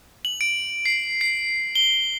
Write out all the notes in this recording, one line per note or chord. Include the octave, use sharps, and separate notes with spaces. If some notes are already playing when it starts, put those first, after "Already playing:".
F#7
D7
C7
C7
G7